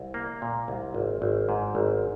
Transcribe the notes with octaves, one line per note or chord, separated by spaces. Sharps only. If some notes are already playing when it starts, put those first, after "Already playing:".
Already playing: C2
A#3
A#2
C2
G#1
G#1
G#2
G#1